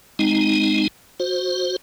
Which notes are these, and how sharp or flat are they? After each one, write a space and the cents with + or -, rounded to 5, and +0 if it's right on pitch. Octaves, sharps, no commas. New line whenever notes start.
G#3 +0 C4 -20 D#4 +0
F#4 -20 C5 +10